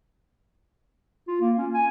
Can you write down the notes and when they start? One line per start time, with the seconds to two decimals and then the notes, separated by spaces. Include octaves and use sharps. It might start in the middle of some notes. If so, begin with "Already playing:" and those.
1.28 F4
1.41 A#3
1.58 C#4
1.74 G#5